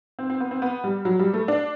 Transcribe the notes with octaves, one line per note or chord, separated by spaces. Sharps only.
C4
C4
B3
C4
B3
G3
F#3
G3
A3
D4